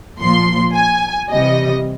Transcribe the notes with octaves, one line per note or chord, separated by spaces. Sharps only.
A#2 F3 C6
G#5
C3 E3 G3 D#5